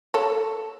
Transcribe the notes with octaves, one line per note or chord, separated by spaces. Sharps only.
A4 C#5